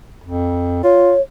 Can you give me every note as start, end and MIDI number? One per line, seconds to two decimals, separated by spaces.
0.24 0.80 41
0.84 1.13 65
0.84 1.21 73